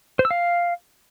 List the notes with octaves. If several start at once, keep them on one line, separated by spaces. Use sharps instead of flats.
C5
E6
F5